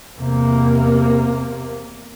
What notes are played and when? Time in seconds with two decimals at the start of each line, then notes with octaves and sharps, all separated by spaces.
0.18 E2 C3 A#3